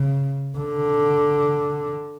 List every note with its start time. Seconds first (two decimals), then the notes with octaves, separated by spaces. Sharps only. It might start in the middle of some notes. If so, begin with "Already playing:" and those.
Already playing: C#3
0.59 D3